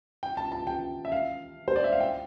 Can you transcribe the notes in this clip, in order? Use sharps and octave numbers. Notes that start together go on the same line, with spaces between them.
G5
A5
A5
G5
E5
F5
C5
D5
E5
F5
G5